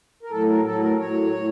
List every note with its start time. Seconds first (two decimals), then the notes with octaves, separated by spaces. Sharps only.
0.23 A#4
0.31 A2 F#3 A4
0.49 A#4
0.65 A2 F#3 A4
0.81 A#4
0.99 A2 F#3 C#5
1.33 A2